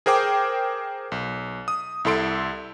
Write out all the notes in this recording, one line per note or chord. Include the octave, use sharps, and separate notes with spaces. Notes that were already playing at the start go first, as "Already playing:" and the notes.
G#4 A#4 C5 G5 D6
B1
D#6
C2 E4 A4 C6 D7